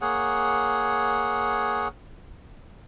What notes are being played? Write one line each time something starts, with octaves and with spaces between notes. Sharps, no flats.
A#3 G#4 C#5 F#5